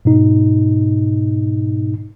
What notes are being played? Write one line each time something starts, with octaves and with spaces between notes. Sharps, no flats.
G#2 B2 D#4